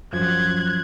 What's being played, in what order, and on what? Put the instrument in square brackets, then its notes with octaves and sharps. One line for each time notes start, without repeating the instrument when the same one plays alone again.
[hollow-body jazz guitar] F#2 F3 [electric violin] F#6 G#6